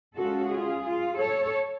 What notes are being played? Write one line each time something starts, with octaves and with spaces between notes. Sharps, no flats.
C#3 G#3 C#4 F4 F#4 A4
F4 G#4
F4
A4 C#5